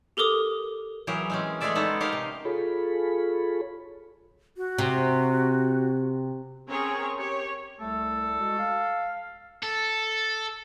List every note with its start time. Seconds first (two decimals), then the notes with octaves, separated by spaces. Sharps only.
0.17 G4 A4 A#4 D6 D#6
1.07 E3 F#3 G4 G#4 A#4
1.30 G#3 C4 C#4
1.61 G#3 A3 G#4 A4 D5 E5
1.75 G#3 B3 C#4 D#4 A4
2.00 D#4 G4 A#4 D#5 F5
2.12 C3
2.45 F4 G#4 A4 C#5 B5
4.57 F#4
4.78 C3
6.68 C4 C#4 G#4 A#4 C#5
7.18 G4 C#5
7.80 C2 G3 A3 A4
8.40 G#3 F#4
8.59 F5
9.63 A4